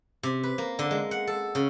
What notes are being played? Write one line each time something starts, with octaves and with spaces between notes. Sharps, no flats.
C3
B4
A#3
D3
G#3
F#5
A4
C#3